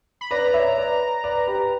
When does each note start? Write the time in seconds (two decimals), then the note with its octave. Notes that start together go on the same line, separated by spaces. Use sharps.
0.21 B5
0.31 B4 D5 A#5
0.47 D5
0.54 C#5 E5
0.78 B4 D5
1.24 B4 D5
1.47 G4 B4